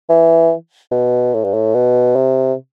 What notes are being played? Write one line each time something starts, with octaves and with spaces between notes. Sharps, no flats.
E3
B2
A2
G2
A2
B2
C3